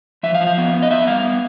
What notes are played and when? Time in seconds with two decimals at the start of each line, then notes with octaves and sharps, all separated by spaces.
0.23 F3 E5
0.34 F5
0.41 F3
0.47 F5
0.58 B3
0.74 B3
0.83 D#5
0.91 B3 E5
1.07 G3 F5
1.24 B3